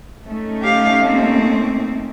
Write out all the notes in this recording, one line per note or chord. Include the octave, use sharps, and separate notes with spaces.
A3 C#4 D#4
G4 F5
A#3 C4